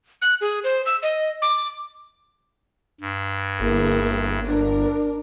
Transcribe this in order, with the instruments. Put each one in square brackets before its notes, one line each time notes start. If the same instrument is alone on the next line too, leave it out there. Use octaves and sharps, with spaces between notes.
[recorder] F#6
G#4
C5
E6
D#5
D6
[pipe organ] G2
[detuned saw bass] G1 [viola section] A#3 E4 G#4
[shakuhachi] D4 [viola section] A#4